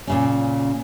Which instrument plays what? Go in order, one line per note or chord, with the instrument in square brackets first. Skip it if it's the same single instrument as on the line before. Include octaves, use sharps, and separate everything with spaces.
[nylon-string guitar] A#2 C#3 C#4